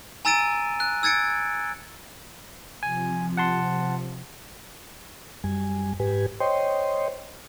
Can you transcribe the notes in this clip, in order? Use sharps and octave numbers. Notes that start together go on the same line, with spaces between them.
G#5 A#5 E6 A6 D7 D#7
F#6
E6 G#6 A6 C#7 D7
C3 F3 G#5
F#5 A5 C6
F#2 G3 G#5
G#2 G4 B4 G#5
C5 C#5 D#5 G5 C6